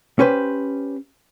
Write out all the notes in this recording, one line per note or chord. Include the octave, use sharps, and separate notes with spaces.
C#4 G4 B4 C5